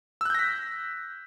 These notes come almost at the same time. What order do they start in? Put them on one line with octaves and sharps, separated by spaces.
E6 F#6 G6 A#6 B6